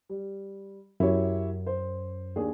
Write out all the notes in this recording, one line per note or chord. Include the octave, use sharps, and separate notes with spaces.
G3
F#2 E4 G4 C#5
C5
D#2 D4 G#4